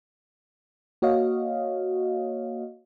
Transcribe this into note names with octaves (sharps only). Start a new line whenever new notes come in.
A#3 F#4 C#5 D#5 F5